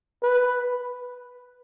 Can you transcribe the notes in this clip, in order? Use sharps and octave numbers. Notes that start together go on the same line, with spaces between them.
B4